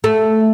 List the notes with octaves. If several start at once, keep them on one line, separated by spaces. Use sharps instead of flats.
A3